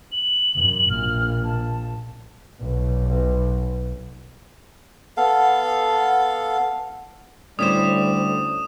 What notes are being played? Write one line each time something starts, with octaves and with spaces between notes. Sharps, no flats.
F#7
F#2
A#1 F6
A5
B1
B3 A4 F5
D2 G3 C#4 E4 C5 D#6 E7